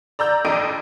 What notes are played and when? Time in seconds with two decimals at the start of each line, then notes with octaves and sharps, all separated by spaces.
0.19 D5 A#5 E6 G6
0.45 A#1 F2 D#5 D6 D7 D#7